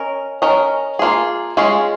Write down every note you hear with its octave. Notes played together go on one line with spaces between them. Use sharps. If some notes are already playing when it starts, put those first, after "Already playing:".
Already playing: C#4 A#4 D#5
C#4 A#4 D#5
A#3 F4 G#4
G#3 C#4 F4 G#4